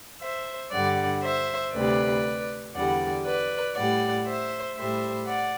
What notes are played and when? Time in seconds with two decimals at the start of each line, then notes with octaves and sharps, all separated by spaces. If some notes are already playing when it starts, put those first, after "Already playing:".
0.21 C5 E5
0.71 G2 D3 G3 D5 F#5
1.22 C5 E5
1.73 D2 C3 G3 B4 D5
2.74 E2 D3 G3 D5 F#5
3.25 B4 D5
3.75 A2 G3 D5 F#5
4.26 C5 E5
4.77 A2 G3 C5 E5
5.27 D5 F#5